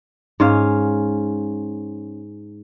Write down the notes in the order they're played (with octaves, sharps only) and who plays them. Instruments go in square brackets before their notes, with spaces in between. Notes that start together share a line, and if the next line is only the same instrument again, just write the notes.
[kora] G#2 C#4 F5